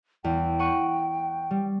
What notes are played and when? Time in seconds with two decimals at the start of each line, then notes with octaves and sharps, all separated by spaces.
0.24 E2 G5
0.59 F#5 C#6 D#7
1.51 G3